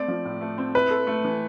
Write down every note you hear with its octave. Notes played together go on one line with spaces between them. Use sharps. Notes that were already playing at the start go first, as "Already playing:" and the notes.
Already playing: A3 C4 D5
F3
A2
A3
C4
E4 B4
A4
A3
E3